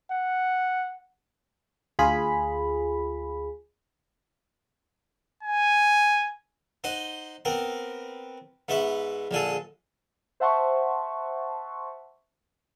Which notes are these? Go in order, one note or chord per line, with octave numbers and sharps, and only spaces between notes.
F#5
D2 F4 G#4 B5
G#5
D#4 C5 F#5
B3 C4 A#4
G#2 B3 E5 B5 C#6
A#1 D3 G#4 A4
C5 E5 F#5 A5 C6 C#6